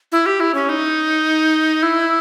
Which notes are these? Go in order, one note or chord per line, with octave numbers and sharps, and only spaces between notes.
E4
G4
E4
C#4
D#4
E4